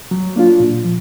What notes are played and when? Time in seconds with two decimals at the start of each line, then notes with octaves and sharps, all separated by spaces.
0.11 F#3
0.36 A#3 D4 F4
0.60 A#2
0.85 F3